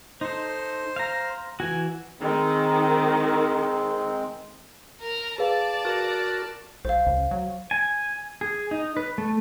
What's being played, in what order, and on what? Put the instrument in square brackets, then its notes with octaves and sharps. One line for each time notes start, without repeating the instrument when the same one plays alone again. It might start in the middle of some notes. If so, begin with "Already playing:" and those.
[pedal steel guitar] D#4 A4 [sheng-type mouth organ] C5
[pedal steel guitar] F5 A#5
[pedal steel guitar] E3 F#4 [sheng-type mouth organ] G#5
[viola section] D#3 [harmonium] G#3 C4
[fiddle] A#4 A#5
[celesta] G#4 B4 F5 [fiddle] D5 A5
[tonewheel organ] F#4 A#4
[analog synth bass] B1 [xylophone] C5 F5
[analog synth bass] C#2
F#3
[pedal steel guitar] G#5
G#4
D#4
B4
A3